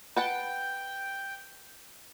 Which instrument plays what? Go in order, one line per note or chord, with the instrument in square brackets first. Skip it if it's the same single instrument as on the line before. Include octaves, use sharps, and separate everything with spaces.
[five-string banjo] B4 F#5 A5 [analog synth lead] G5